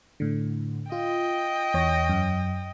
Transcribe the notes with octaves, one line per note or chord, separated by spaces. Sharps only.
A2 D3
F4 D#5 G5
E2 C#5 A#6
F#2